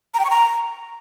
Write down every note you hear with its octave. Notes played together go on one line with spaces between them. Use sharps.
A#5
G5
C#6
A#5